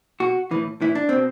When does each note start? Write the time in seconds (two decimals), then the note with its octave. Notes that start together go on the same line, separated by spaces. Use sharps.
0.20 B2 F#4
0.51 A2 E3
0.81 A2 E3 E4
0.95 D4
1.09 B2 C4